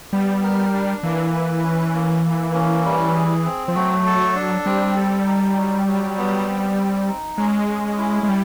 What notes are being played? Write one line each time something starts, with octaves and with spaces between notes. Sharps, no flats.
G3 B3
A#4
D4
E3 A#3
B4
C#4
A#3
A#3
C#4
G3
G#4
C4
F3
F#3 A3
A4
D4
G3 C4
A4
D#4
F#3
F#3
B3
C4
C4
D#4
G#3 C#4
C#4
E4
G#3
G3